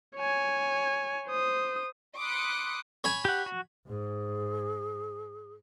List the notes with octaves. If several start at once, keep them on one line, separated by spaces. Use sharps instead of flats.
C#5 G#5
C5 D#6
B5 C6 D6 D#6 F#6 C#7
C#5 G#5 B5
G4 F#5
F#4
G#2 G#4